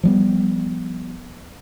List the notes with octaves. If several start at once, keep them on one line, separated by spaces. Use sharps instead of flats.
F3 G3 B3